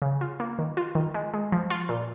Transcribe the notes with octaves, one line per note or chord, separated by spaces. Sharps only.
C#3
F4
A#3
D#3
F4
D#3
G#3
G#3
F3
F4
A#2